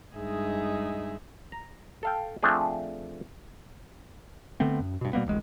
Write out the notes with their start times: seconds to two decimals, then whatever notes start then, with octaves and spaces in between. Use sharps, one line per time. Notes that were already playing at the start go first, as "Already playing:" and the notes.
0.14 G2 G#3 D#4 G#4 E5
1.52 A#5
2.03 A4 F5 G5
2.43 F3 A3 C4 D4 G#4
4.60 D3 A3 B3 C4
4.80 F#2
5.01 G2 B2
5.13 B2 G3 A#3 B3
5.27 D1 A1 G#3